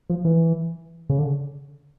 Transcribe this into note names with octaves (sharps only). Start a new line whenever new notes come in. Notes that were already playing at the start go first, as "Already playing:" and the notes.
F3
E3
C#3
D3